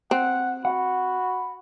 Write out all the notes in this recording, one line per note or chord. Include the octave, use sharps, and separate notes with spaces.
C4 F#5
F#4 F#5 B5